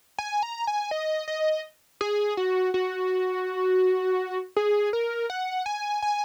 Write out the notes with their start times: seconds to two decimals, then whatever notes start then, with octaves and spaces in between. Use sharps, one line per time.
0.19 G#5
0.43 A#5
0.67 G#5
0.91 D#5
1.28 D#5
2.01 G#4
2.37 F#4
2.74 F#4
4.56 G#4
4.93 A#4
5.30 F#5
5.66 G#5
6.02 G#5